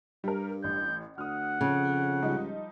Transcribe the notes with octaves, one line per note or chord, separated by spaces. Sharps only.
G2 G3 A#4
A1 G6
D2 F#5 D#6 F6
F2 C#3
C#2 F3 G3 D#4